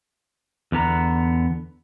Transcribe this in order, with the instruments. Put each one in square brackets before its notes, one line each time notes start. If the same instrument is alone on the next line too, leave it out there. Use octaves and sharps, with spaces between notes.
[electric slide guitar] E2 D3 B3 A#5